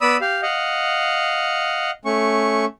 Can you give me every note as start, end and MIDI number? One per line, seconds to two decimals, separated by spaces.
0.01 0.17 59
0.01 0.17 74
0.01 0.17 83
0.01 0.17 87
0.01 0.17 88
0.21 0.42 67
0.21 0.42 77
0.43 1.91 75
0.43 1.91 77
0.43 1.91 78
2.05 2.65 57
2.05 2.65 61
2.05 2.65 85